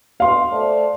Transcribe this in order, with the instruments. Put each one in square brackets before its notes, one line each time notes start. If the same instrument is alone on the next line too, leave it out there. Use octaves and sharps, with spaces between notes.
[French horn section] B2 [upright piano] F5 C6
[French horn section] A3 C5 D5